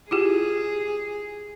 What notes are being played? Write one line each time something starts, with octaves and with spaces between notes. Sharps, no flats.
E4 F4 G4 G#4